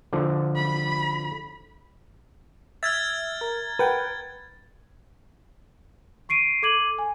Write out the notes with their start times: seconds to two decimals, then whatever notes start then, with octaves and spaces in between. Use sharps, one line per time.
0.13 D3 F3
0.56 B5
2.83 E5 F6 G#6 A6
3.41 A#4
3.79 A#4 B4 F#5 G5
6.29 C#6 C7 D7 D#7
6.63 A4 D6 G#6 D#7 F#7
6.99 G#5